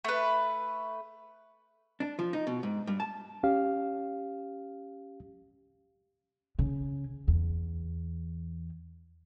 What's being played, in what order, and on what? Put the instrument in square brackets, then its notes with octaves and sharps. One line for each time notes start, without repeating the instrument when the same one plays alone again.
[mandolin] A3 B4
[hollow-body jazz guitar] D4
F3
D#4
B2
G#2
G2
A5
[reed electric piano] C#4 G4 F5
[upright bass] C#3
E2